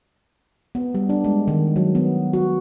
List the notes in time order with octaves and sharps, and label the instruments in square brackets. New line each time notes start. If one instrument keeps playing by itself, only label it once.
[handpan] B3
G3
D4
G#3
D#3
F#3
B3
F#4